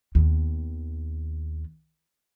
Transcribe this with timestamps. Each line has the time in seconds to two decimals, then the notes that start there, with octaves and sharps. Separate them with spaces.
0.15 D#2 B3